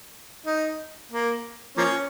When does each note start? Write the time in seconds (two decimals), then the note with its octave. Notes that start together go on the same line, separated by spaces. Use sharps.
0.47 D#4
1.12 A#3
1.77 F3 A#3 C#4